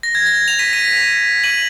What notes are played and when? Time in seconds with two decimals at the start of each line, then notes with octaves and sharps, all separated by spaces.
0.03 A#6
0.15 G#6
0.26 A#6
0.48 F7
0.59 B6 D#7
0.73 B6 D#7
1.44 D#7 F#7